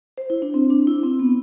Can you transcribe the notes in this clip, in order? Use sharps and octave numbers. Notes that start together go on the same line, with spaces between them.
C5
E4
D4
C4
D4
E4
C4
B3